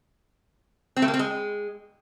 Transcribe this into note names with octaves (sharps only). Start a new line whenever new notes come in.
C4
A3
A#3
C4
G#3